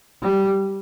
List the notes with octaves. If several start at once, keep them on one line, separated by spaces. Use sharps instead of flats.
G3